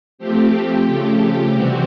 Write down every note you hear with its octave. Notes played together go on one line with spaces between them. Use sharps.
F3 A3 C4 G4
C#3 F3 A3
C3 E3 G3 C4 F#4